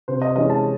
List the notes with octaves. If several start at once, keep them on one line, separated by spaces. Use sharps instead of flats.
C3 C5
D#5
E3 G#3 C#4 E4 D#5
A5